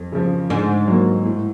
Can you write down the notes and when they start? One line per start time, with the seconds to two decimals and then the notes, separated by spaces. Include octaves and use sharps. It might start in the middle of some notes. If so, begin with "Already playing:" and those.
Already playing: F2
0.12 C#3 F3
0.50 G#2 D3
0.88 F#3 A#3
1.25 A2